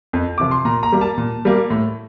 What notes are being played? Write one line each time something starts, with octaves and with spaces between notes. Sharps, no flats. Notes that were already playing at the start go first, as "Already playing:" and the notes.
F2
C3 F3 D6
C6
A#2 A#5
A#5
G3 A#3
A5
A#2
G3 A#3
A2